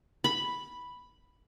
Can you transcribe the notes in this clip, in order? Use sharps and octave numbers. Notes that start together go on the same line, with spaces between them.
B5